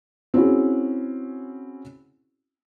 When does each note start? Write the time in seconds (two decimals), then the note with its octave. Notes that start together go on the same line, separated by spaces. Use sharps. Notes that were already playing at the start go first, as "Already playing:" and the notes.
0.34 C4 C#4 E4 F#4 G#4